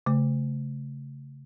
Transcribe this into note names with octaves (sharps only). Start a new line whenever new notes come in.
C#3 A3